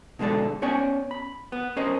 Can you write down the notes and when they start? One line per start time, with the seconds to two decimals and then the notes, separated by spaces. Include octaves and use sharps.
0.19 B2 D3 G#3 A4 D5
0.62 B3 C#4 C#5 D5 G5 G#5
1.11 B5
1.52 B3
1.77 C#4 A#4 C5 D#5